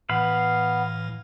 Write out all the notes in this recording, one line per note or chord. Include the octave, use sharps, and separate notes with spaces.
A2 E3 B3 F5 B5